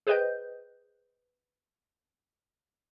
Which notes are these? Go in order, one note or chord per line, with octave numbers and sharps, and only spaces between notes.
G#4 B4 C5 D#5 G5 G6